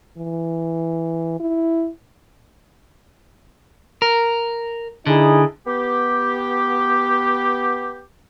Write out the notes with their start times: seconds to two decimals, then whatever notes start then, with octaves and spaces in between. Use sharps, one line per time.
0.17 E3
1.40 E4
4.02 A#4
5.06 D3 D#4 E4 G#4
5.67 B3 G4